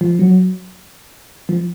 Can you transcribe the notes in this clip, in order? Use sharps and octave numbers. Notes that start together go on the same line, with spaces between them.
F3
F#3
F3